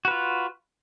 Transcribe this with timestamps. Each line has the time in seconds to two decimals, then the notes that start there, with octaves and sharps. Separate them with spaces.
0.05 F#4
0.08 B4
0.11 F4